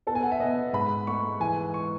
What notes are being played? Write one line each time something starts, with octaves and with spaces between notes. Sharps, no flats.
B3 A4
G#5
F#5
E5
B3 D#5
G#2 B5
A3 C#6
E3 G#5
C#6